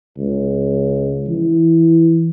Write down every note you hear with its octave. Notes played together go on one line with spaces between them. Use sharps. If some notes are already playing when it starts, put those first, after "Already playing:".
C#2
E3